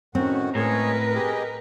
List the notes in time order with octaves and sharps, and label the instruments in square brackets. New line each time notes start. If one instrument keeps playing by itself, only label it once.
[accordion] A2 D#3 F#4 [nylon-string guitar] C4 [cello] C#4
[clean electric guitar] A2 [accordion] G#3 G#4 C#5 [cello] A#4 B4
[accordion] G4 G#4 D#5